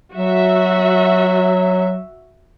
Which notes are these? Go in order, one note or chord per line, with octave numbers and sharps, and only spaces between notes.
F#3 F#4 E5